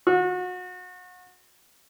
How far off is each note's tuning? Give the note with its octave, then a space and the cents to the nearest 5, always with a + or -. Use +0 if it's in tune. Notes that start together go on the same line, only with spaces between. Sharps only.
F#4 -30